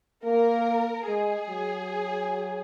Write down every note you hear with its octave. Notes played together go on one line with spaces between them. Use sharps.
A#3 A#4
G#3 G#4
F#3